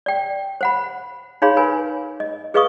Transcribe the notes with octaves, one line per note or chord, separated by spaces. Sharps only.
D5 G5
C5 F#5 B5
D#4 G#4 C#5 F5 B5 C6
A#4 B4 G#5 B5
D#5
G#4 B4 D#5 F5 C#6 D#6